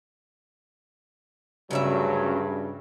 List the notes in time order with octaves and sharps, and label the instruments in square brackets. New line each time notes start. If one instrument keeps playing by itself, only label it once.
[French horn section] D2 F#3 C#4 [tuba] G2 [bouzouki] C#3 G3 E5